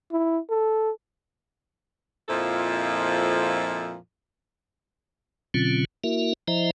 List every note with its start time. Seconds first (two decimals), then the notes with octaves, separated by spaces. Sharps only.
0.12 E4
0.50 A4
2.29 F2 A#2 F3 G#3 E4 A4
5.54 B2 D3 F#3 C4 C#4 F4
6.04 A#3 E4 F#4 A#4 E5
6.48 F3 E4 C5 D#5 E5 A#5